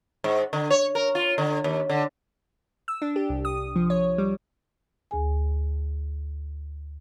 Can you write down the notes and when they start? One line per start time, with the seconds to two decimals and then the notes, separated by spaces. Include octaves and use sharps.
0.24 G#2
0.53 D3
0.70 C#5
0.95 A#4
1.15 F4
1.38 D3
1.64 D#2
1.89 D3
2.88 E6
3.02 D4
3.16 G4
3.29 C2
3.45 D#6
3.76 F3
3.90 C#5
4.18 G3
5.11 D2 G#4 G#5